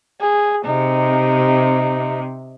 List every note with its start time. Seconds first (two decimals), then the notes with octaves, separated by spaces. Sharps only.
0.21 G#4
0.65 C3 D#4